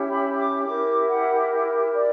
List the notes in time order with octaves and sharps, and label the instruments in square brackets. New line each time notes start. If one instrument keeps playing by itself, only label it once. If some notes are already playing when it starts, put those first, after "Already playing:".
Already playing: [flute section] C#4 E4 G4
B5
D6
E4 G4 A#4 D6
F#5
D5